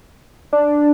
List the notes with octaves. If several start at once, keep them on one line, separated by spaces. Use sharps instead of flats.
D4